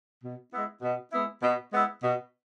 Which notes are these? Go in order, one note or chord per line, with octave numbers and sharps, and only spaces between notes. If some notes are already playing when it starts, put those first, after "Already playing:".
B2
G#3 B3 E4
B2
G#3 B3 E4
B2
G#3 B3 E4
B2